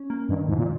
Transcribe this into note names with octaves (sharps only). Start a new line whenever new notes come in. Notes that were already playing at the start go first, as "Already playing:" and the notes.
Already playing: C#4
A#3
G2 D#3
F2 G#2
A#2